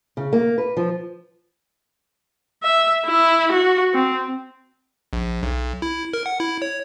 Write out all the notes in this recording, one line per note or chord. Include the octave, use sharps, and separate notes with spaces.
C#3
A#3
B4
F3
E5
E4
F#4
C4
A#1
B1
E4
A#4
F#5
E4
C#5